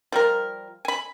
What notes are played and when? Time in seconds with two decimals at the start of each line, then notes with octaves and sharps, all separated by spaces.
0.12 F3 G3 A#4
0.85 G#5 B5